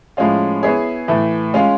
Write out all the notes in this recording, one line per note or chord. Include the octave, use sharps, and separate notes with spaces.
A2 F3 G#3 C#4 F4
B3 E4 G#4 C#5
A2 E3 A3
G#3 C#4 F4